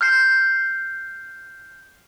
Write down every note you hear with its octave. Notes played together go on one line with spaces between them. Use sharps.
F6 G6 C7